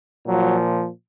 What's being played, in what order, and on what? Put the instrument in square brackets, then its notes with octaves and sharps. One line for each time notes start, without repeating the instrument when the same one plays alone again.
[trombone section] A#2 F3 F#3